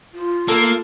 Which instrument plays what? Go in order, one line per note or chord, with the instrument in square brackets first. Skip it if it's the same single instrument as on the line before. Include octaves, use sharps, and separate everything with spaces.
[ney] F4
[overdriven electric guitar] A#3 [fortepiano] A4